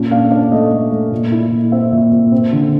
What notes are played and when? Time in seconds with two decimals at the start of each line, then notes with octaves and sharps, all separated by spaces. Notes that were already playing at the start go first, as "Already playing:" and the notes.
Already playing: A#2 C#4
0.11 D4 F5
0.31 D4 D5
0.52 A3 D#5
0.72 A3
0.91 A3
1.12 A#2
1.32 E4
1.51 A#2
1.72 C4 E5
1.92 A#2
2.12 A#2
2.32 C4
2.53 D3